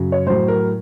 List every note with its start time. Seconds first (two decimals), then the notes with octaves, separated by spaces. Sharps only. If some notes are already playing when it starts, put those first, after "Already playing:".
Already playing: F#2 C#3 F#3
0.12 C#5
0.26 A2 F#3 C5
0.48 A#4